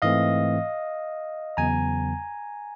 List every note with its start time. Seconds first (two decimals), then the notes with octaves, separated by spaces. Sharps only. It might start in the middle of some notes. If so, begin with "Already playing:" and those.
0.02 G#2 E3 A3 C4 D#5 F5
1.57 E2 C#3 F#3 B3 G#5 A#5